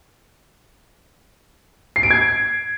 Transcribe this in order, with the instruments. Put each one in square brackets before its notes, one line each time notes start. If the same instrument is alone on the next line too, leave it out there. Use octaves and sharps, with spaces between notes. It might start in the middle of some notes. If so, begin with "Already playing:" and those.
[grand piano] C7
D7
G#6